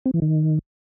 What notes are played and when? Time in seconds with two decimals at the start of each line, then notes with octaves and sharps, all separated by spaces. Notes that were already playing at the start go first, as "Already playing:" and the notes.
0.06 C4
0.14 E3
0.22 D#3